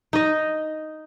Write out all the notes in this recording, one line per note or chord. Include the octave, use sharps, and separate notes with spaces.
D#4 D#5